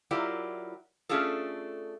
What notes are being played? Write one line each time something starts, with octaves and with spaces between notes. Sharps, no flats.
F#3 E4 F4 G4 A#4 D5
A3 C#4 D4 F4 G#4 A4